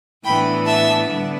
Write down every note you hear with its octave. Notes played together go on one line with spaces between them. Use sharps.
A2 E3 B3 D4 G5 B5
E5 A5
D3 G3 B3 D4